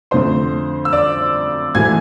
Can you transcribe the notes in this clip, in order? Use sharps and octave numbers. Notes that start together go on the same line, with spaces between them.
F2 D3 A3 C5 C6
E6
D5 D6
G#2 E3 A3 G#5 G#6